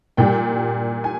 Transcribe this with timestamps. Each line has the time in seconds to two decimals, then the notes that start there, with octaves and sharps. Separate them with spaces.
0.17 A#2 G3 G5
1.04 G#5